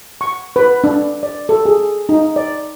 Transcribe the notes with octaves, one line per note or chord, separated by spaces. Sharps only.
C#6
B4
D4
D5
A4
G#4
D#4
D5